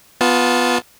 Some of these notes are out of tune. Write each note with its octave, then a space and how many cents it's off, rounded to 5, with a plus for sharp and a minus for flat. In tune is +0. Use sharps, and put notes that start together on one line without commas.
B3 +0 F4 +15 A5 -25